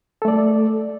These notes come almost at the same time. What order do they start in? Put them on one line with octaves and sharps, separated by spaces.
A4 A3 D5